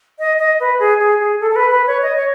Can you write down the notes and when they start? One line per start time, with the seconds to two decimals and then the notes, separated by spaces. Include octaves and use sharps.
0.19 D#5
0.39 D#5
0.60 B4
0.80 G#4
1.00 G#4
1.21 G#4
1.40 A4
1.51 A4
1.56 B4
1.71 B4
1.87 C#5
2.02 D#5
2.16 C#5